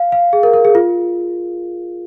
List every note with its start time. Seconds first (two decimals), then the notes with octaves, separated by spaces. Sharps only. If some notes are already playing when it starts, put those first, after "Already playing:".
Already playing: F5
0.12 F5
0.33 G#4
0.43 A#4
0.53 A#4
0.65 G#4
0.75 F4